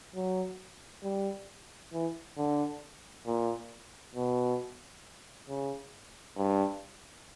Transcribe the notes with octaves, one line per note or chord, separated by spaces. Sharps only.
F#3
G3
E3
D3
A#2
B2
C#3
G2